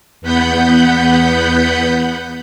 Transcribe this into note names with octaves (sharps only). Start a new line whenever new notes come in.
E2 B3 F#5 B5 G6